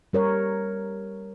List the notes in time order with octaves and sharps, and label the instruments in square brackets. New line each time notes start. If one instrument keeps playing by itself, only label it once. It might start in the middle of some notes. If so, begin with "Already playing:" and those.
[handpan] G3 A#4 C#5